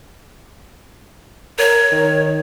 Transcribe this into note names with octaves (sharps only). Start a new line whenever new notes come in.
A#4 C#5
D#3